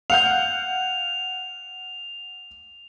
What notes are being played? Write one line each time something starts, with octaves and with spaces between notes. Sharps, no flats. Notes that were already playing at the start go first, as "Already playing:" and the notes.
F5 F#5 G6 F7